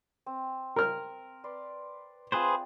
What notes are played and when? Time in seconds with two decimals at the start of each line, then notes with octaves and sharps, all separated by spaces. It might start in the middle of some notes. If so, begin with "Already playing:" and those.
0.26 C4
0.76 A#4 F6
1.44 B4 D5 C6
2.32 C4 F4 G#4 B4 C5